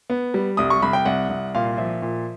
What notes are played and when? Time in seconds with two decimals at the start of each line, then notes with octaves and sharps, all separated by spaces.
0.10 B3
0.34 G3
0.57 C2 D#6
0.70 C#6
0.82 C2 B5
0.93 G5
1.05 C2 F#5
1.29 C2
1.55 A#2 F5
1.78 F3 E5
2.02 A#2